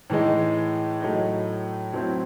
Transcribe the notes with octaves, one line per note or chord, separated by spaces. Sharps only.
A2 E3 G#3 D#4
A2 F#3 A3 D#4
A2 F#3 C4 E4